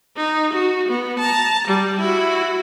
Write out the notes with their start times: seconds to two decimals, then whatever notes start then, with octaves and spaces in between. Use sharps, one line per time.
0.16 D#4
0.53 F#4
0.88 B3
1.19 A5 A#5
1.67 G3
2.00 E4 F#4